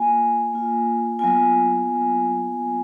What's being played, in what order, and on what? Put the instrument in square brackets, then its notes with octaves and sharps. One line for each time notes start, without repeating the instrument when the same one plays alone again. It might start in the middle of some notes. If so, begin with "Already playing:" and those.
Already playing: [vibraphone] A#3 F4 G#5
A#3 F4
F#3 B3 F4 G#5